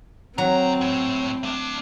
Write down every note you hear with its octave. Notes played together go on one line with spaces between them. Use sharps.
D2 F#3 C4 A#5
A2 C#5
A3 D4